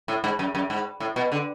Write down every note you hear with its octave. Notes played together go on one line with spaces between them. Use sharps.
A2
G#2
F#2
F#2
G#2
A2
B2
D3